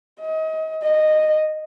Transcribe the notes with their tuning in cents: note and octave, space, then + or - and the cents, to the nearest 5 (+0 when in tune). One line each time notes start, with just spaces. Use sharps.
D#5 +30
D#5 -10